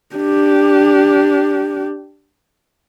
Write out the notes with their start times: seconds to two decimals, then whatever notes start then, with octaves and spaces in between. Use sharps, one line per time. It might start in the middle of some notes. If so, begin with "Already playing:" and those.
0.16 D4 G4